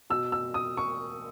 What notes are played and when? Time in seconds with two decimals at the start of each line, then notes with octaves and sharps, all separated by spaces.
0.10 B2 E6
0.32 E6
0.54 D#6
0.77 C#6